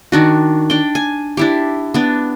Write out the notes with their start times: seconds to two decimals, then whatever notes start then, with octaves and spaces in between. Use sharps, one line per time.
0.12 D#3 D4 F#4
0.70 D4 G5
0.95 G#5
1.37 D4 E4 G4
1.94 B3 D4